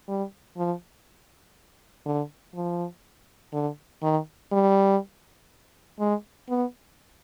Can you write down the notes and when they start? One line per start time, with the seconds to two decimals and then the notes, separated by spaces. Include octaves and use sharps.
0.08 G3
0.57 F3
2.06 D3
2.55 F3
3.53 D3
4.03 D#3
4.52 G3
6.00 G#3
6.49 B3